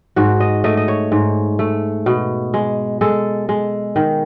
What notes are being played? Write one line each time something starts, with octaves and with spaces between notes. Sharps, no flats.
G#2 F#4
D#5
A3 D#5
D#5
C#5
G#2
A3
B2
G#3
G#3 A4
G#3
D#3